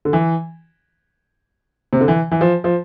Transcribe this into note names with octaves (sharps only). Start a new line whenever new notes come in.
D3
E3
C3
D3
E3
E3
F3
F3